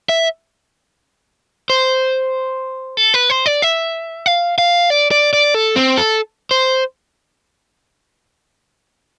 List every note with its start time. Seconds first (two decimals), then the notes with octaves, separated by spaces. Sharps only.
0.09 E5
1.70 C5
2.97 A4
3.14 B4
3.30 C5
3.46 D5
3.62 E5
4.26 F5
4.58 F5
4.90 D5
5.11 D5
5.33 D5
5.54 A4
5.76 C4
5.97 A4
6.51 C5